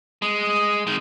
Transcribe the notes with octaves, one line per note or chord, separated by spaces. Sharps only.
G#3
D#3 G#3